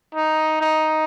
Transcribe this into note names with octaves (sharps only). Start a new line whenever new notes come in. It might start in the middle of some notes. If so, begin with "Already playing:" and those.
D#4
D#4